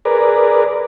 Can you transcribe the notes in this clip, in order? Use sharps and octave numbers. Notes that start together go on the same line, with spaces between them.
G#4 A#4 B4 D5